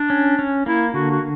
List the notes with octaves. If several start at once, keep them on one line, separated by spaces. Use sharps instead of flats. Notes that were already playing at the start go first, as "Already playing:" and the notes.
Already playing: D4
C#4
C#4
A#3 E4
D3 F#4
F#4